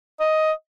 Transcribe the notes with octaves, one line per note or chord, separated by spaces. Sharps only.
D#5